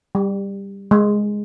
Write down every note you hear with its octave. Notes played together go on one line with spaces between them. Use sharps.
G3
G#3